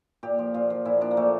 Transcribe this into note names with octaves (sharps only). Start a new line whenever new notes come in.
A#2 G4
F3
A#2 F4
F3
A#2 E4
F3 D4
A#3
A#2 A3